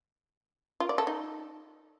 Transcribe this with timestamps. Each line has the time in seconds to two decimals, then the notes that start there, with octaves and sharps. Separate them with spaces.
0.80 F4
0.89 D5
0.98 A4
1.07 D#4